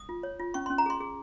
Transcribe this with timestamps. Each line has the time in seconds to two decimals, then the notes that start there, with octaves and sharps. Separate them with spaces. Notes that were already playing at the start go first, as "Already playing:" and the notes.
Already playing: D#6
0.09 F4
0.23 C#5
0.40 F4
0.54 C#4 C#6
0.66 C#4 C6
0.78 A#5
0.86 G#4 C6
1.00 G#4